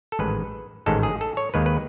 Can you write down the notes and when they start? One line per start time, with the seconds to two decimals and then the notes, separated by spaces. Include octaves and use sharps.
0.12 A4
0.19 A1 G#2 D#3 G#3 B4
0.86 A1 G#2 D#3 G#3 A4
1.03 G#4
1.21 A4
1.37 C#5
1.54 D#2 D#3 G#3 B4
1.66 B4